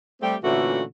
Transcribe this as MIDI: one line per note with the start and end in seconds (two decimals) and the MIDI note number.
0.22 0.35 55
0.22 0.35 57
0.22 0.35 60
0.22 0.35 67
0.43 0.82 46
0.43 0.82 50
0.43 0.82 52
0.43 0.82 57
0.43 0.82 61
0.43 0.82 66